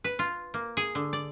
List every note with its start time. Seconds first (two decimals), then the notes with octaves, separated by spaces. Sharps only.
0.04 B4
0.19 F4
0.54 A#3
0.77 G#4
0.95 D3
1.13 D5